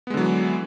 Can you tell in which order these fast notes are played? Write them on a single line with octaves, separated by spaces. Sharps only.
B3 G#3 D3 F#3 E3